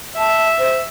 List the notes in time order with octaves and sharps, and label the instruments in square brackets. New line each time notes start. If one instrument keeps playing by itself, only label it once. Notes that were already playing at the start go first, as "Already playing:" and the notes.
[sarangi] E5 [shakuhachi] A5
[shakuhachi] C5